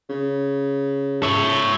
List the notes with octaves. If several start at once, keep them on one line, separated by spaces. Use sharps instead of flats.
C#3
C#5 E5